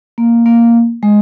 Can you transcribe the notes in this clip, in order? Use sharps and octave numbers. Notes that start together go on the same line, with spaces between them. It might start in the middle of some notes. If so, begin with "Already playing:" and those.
A#3
A#3
G#3